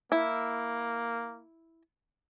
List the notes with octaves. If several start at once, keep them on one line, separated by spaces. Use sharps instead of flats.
A#3 E4